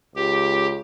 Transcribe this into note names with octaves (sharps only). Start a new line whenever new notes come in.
C#2 G4